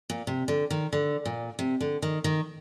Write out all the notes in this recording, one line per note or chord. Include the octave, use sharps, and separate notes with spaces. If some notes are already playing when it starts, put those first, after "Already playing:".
A#2
C3
D3
D#3
D3
A#2
C3
D3
D#3
D#3